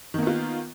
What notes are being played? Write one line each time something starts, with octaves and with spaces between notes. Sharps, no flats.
D#3 A#3 B3 F4